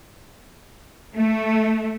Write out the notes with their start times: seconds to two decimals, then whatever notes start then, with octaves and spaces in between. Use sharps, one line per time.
1.15 A3